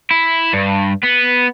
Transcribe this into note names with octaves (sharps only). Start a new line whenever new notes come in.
E4
G2
B3